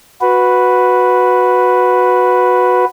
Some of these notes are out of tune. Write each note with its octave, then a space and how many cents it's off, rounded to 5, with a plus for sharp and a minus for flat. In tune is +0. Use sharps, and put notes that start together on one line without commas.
F#4 -10 B4 +0